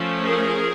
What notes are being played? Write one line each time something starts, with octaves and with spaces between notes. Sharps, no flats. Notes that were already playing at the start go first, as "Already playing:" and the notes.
Already playing: F3 A3 C#4
G#4 A#4